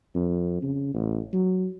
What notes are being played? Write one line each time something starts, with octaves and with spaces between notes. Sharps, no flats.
F2
C#3
A1
F#3